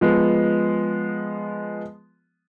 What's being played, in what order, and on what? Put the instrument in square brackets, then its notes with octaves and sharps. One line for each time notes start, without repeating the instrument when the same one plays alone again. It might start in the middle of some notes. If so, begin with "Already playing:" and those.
[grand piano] F3 G#3 B3